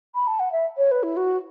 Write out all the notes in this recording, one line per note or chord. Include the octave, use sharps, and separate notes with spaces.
B5
A5
F#5
E5
C#5
B4
E4
F#4